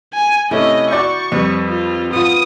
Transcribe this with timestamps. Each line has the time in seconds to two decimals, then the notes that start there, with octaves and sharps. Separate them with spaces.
0.14 G#5
0.51 C3 A3 C#4 E4 D#5
0.91 F#4 D5 C#6 G6
1.32 F2 G3 B4
1.69 F4
2.13 B3 F4 D#6